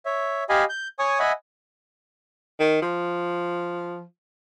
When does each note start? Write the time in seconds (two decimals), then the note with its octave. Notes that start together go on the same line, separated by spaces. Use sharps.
0.05 C#5 E5
0.49 G4 D#5 F5 G#5 B5
0.69 G6
0.99 C#5 G#5 C#6 D#6
1.19 D#5 E5 F#5 G#5 B5
2.60 D#3
2.82 F3